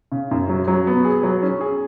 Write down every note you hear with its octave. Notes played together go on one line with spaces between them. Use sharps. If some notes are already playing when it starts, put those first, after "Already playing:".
C#3
F#2
F#3
F#3
B3
G#4
F#3
C#4
G#4